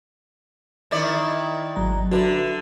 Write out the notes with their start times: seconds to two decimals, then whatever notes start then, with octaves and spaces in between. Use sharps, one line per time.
0.91 D#3 E4 D5
1.76 G#1 F#3 A#5
2.11 D3 F#4 B4 E5